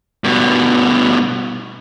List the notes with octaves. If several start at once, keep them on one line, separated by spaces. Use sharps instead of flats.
G2 B2